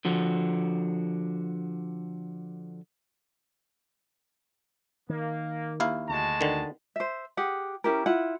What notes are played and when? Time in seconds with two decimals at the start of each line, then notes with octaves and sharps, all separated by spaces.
0.05 D3 F3 F#4
5.09 D#3 A#3
5.80 D#2 E4 F5
6.09 D2 G#3 F#4 A5
6.41 D3 D#3
6.96 C5 E5
7.37 G4 G#4 F#5
7.84 C#4 E4 G4 A#4
8.06 E4 F4 F#5